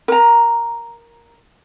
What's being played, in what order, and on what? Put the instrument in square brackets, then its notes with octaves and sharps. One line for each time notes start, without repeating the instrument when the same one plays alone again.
[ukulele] A#4 A#5